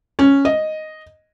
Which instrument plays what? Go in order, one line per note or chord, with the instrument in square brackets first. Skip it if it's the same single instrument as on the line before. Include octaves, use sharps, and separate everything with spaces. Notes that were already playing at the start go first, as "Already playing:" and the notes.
[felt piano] C#4
D#5